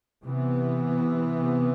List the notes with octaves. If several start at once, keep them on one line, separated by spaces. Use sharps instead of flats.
C3 E3 B3